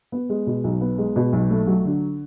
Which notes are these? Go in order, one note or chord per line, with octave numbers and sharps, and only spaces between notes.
B3
G#3
B2
B1
B3
G#3
B2
B1
A3
F#3
D3